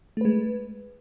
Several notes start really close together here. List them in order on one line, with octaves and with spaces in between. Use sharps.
A3 B4 G#3